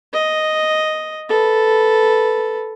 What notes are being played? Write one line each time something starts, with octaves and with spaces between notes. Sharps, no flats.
D#5
A4 B4